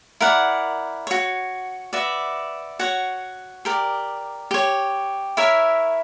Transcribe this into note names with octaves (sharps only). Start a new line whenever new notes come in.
E4 A#4 D5 F#5
F#4 C#5
F#4 B4 D5 E5
F#4 C#5 F#5
G4 A#4 D5
G4 C#5
E4 A#4 C#5 E5